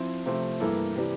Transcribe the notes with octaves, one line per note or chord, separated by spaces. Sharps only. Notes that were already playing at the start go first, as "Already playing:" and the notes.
Already playing: F3 C4 E4
C3 F3 A3 C4
G2 E3 A#3 E4 A4
C3 E3 G3